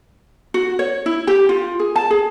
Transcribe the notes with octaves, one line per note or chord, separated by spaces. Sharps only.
F#4
C#5
E4
G4
F4
G#4
A5
G#4